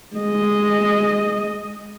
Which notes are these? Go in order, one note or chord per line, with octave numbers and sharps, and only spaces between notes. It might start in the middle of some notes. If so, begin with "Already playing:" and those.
G#3 D#5